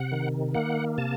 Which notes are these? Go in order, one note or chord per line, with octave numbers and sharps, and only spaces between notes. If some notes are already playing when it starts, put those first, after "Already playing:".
Already playing: C3 F#5
D#3
A#3 F#5
C3 A5